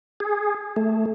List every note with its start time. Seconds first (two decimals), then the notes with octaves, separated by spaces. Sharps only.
0.20 G#4
0.76 A3